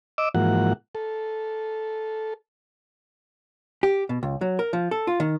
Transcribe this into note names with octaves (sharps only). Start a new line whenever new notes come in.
D#5 D6 E6
G#2 E3 F3 A#3 F#4 F#5
A4
G4
B2
C#2
F#3
A#4
F3
A4
F4
D#3